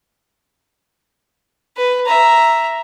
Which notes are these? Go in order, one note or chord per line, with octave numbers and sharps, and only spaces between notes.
B4
E5 A#5